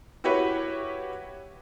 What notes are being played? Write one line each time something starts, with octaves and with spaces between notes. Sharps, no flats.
E4 F#4 G4 B4 C#5